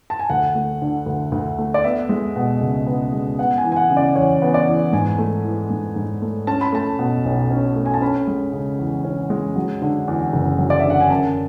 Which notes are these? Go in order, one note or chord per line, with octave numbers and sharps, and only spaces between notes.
A5
G#5
D2 F#5
A3
D3
D2
D2
A3
D5
B3 E5
G#3
B2
C#2
B3
G#3
B3 F#5
G#5
E3
G#5
F#5
C#3
D5
E2 C#5
B3
D5
E3
G#2 G#5
A3
E3
G#2
G#2
A3
C#4 A5
B5
A3 A5
B2
B1
C#4
A3
G#5
A5
C#4 B5
G#3
C#3
E2
C#4
G#3
F#3
D3
E2
F#1
F#3
D5
D3 E5
F#5
G#5
F#2 A5